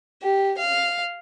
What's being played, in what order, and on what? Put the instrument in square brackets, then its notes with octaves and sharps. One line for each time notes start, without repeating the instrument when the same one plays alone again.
[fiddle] G4
F5